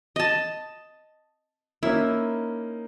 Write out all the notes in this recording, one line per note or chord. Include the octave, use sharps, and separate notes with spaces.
D#5 A5
A#3 C#4 D#4 E4